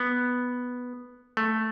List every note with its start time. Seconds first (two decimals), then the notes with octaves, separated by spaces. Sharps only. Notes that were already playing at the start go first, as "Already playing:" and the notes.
Already playing: B3
1.37 A3